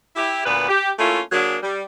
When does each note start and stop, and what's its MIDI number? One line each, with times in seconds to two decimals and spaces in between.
0.16 0.43 64
0.16 0.43 67
0.46 0.66 38
0.46 0.66 46
0.46 0.66 59
0.46 0.66 71
0.69 0.90 67
0.98 1.20 57
0.98 1.20 58
0.98 1.20 61
0.98 1.20 64
0.98 1.20 65
1.32 1.57 54
1.32 1.57 58
1.32 1.57 62
1.32 1.57 68
1.62 1.82 55